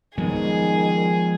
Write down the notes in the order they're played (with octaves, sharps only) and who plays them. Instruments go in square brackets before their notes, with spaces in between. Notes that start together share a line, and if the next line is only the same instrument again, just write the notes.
[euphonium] D#3 [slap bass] F3 G#3 B3 [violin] G#4